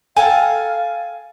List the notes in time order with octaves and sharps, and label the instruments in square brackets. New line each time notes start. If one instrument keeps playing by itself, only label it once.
[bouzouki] A4 G5 A#5 [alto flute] F5 [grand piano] G#5